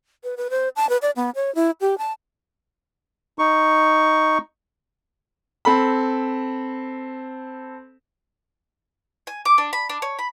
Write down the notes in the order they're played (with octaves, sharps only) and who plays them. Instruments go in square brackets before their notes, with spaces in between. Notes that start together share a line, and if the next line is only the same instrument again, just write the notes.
[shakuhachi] B4
B4
C5
A5
B4
D5
B3
C#5
E4
G4
A5
[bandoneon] D#4 C#6
[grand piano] C4 A4 B5
[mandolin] G#5
D6
D4
B5
D4
C#5
B5